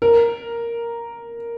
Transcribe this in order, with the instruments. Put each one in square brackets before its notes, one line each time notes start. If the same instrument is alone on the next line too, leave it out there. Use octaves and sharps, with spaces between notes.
[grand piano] A#4